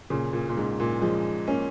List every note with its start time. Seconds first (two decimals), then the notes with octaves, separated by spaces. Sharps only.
0.10 A#2 C#3
0.33 A#2
0.49 A#2
0.57 G#2
0.80 A#2
1.01 F3 G#3
1.47 A#3 C#4